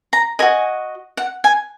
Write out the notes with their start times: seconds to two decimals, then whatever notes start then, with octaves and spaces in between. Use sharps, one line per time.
0.13 A#5
0.39 F#4 A#4 D#5 G#5
1.17 F#5
1.44 G#5